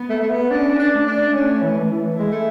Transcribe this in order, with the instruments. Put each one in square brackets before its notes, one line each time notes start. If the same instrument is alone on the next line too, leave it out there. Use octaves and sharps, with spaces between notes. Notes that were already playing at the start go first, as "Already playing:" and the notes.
Already playing: [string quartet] B3
[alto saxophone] A3
A3
B3
[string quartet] C#4 [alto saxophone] D4
[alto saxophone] D4
[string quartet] A3
[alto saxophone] D4
[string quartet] A3 [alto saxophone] C#4
[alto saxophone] E3
E3
[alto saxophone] G#3 [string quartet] E4
[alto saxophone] A3